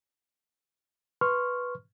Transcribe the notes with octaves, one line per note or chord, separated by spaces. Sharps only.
B4 C6 C#6 F6